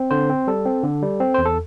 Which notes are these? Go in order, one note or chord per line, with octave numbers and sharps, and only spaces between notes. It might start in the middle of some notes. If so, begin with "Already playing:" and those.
Already playing: C4
D3 C5
C4
G3 A4
C4
D3
G3
C4
E2 C5
A4